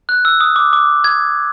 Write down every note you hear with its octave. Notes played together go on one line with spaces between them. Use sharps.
F#6
E6
D#6
D6
D6
G#6